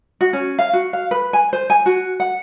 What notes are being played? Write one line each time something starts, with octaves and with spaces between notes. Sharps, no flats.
F#4
C#4
F5
F#4
F5
B4
G#5
C5
G#5
F#4
F#5